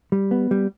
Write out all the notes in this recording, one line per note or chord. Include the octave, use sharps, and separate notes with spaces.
G3
B3
G3